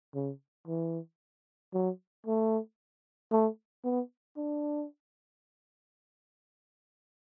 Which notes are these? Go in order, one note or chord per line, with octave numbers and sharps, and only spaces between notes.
C#3
E3
F#3
A3
A3
B3
D4